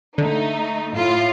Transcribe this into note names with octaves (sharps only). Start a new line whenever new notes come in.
D3 A3 D#4
A2 F4